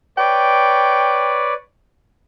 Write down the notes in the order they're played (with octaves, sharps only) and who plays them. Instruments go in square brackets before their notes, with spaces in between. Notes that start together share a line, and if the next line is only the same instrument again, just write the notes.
[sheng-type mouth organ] B4 C#5 D5 [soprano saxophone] G5